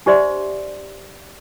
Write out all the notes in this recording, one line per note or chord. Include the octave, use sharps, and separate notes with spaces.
D4 G4 C5 D5 E5 C6